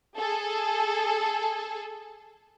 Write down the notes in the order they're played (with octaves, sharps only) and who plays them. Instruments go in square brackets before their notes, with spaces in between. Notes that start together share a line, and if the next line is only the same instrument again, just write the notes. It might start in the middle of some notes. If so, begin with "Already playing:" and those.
[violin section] G#4 A4